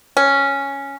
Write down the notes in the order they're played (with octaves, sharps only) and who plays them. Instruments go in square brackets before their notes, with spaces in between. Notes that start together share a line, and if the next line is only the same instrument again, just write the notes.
[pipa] C#4